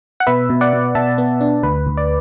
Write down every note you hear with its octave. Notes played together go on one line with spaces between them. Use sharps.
F#5
B2 B4 E5
B2
D5 F#5
B2
B2 E5 A5
B3
D4
D2 B4
D2
D5